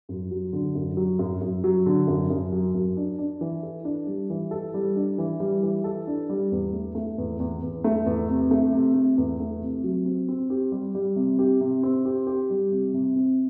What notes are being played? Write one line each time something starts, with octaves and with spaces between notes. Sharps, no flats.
F#2
F#3
D3
F#2
F#3
F#2
F#2
F#3
D3
F#2
F#2
F#3
F#2
D4
D4
E3
A4
D4
G3
E3
A4
G3
D4
E3
G3
E3
A4
D4
G3
E2
A3
A3
E2
E2
E2
A3
E2
C3
A3
C3
A3
E2
A3
C3
F#3
C4
C4
G4
G3
G3
C3
G4
C3
C4
G4
G4
G3
C3
C3
C4